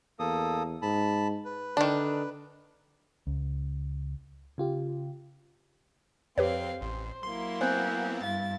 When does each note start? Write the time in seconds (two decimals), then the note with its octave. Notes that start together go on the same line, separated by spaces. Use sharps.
0.19 E2 A#3 A4 D#6
0.82 G#2 A5 B5
1.45 B4
1.77 D3 D#3 D4
3.27 C#2
4.58 C#3 F4 G4
6.38 F2 C4 G4 B4 C#5 F5
6.81 A1 C5
7.23 F#3 A#3 E4 C6
7.61 B3 C4 C5 G#5 F#6 G6
8.23 G2 E4 F5 A6